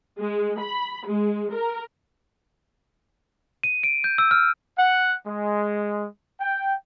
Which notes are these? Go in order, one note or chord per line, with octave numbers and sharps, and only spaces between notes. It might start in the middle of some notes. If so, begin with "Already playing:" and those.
G#3
B5
G#3
A#4
D#7
D7
G6
E6
F6
F#5
G#3
G5